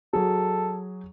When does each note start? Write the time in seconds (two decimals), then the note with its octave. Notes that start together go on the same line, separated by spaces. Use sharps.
0.13 F#3 G#4 A4